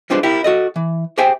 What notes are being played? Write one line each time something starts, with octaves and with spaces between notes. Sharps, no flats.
G3 G#3 D4 F4 B4 C5
E4 G4 A#4
F#4 A4 D#5
E3
G4 G#4 C5 E5 G5 G#5